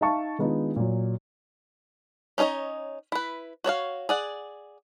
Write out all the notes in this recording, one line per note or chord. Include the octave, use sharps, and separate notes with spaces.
D#4 E5 F5 A5 C#6
D#3 G#3 B3 D4 D#4 F4
A#2 F#3
C#4 D#4 A4 C#5 D#5
E4 B4
F#4 C#5 D5 F5
G#4 D5 F#5